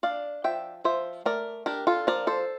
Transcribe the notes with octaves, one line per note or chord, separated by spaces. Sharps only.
D4 D5 F5
F3 E5 G5
F3 C5 E5
A3 A#4 D5
D4 G4 A#4
F4 A4
F3 A#4 D5
A4 C5